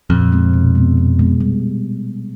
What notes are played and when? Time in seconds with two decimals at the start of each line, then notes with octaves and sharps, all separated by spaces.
0.10 F2 A#2
0.32 F3 G#3 C4
0.54 B2
0.75 G#3 B3
0.97 B2
1.19 G#3 B3
1.40 G3